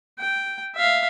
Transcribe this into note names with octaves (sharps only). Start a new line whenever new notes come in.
G5
E5 F5